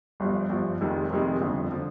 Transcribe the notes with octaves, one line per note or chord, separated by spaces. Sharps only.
G1 G2 F3
G1 G2 F3
F1 F2 C3 D#3 G#3
F1 F2 C3 D#3 G#3
G1 F2 D3 F3
D3 F3